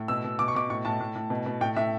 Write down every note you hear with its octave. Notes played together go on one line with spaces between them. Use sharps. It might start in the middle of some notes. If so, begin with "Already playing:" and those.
Already playing: A2
B2 E6
B2
B2 D6
C#6
B2 D6
A2 C#6
A2 A5
A2
A2
B2
B2
A2 G5
A2 E5